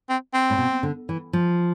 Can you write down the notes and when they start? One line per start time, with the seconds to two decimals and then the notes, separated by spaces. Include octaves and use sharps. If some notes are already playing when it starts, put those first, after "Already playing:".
0.09 C4
0.34 C4
0.50 A2
0.58 B2
0.83 D3
1.09 E3
1.33 F3